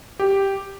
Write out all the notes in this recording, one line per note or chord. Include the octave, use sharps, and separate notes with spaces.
G4